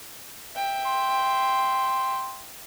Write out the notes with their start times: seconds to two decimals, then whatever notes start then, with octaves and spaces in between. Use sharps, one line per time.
0.53 E5 G5
0.86 C6